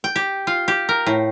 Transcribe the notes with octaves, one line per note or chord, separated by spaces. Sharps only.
G5
G4
F4
G4
A#4
A2